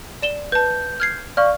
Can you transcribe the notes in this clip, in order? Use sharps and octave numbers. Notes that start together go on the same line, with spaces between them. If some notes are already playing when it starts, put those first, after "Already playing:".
D5 E7 G7
B4 A5 G6
F6 G#6 C7
D5 F5 C#6 F6